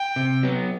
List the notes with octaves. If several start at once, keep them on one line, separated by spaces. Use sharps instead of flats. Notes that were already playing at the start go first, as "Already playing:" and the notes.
Already playing: G5
C3
F#3 B3